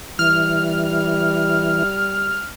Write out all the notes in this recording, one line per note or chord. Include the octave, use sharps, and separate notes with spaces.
E3 G3 F6